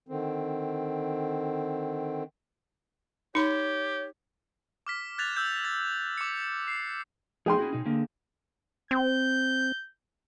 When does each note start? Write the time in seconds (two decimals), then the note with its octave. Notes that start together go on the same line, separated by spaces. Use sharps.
0.08 D3 D#3 C4
3.35 D#4 G4 C#5 B5
4.87 D6 F6 B6
5.18 F#6 G#6 A6 B6 F7
5.37 E6 G6
5.65 A6
6.18 D6 C#7
6.68 C7
7.46 F3 A3 D#4 G#4 G5 C6
7.58 C#4 E4 F#4
7.73 B2 D#4
7.86 D3 A#3
8.91 C4 G6